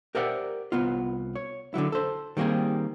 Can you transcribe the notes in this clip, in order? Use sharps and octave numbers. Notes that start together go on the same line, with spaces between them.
G4 A#4 C5 D5 E5 F#5
C2 B3 F4
C#5
D3 D#3 F#3 E4
A4 C5
D#3 G3 A#3 C4 G#4